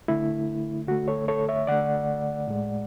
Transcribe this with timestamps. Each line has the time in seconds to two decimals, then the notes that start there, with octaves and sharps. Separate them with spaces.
0.08 D3 A3 E4
0.87 D3 A3 F#4
1.08 A4 C#5
1.28 A4 C#5
1.49 C#5 E5
1.67 D3 A3 D5 F#5
2.48 A2 G#3